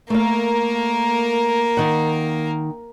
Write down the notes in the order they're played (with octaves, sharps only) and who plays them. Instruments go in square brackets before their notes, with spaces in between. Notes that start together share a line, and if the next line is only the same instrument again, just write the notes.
[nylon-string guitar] A3 F5 [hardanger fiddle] A#3 A#4
[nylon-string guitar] D#3 F#5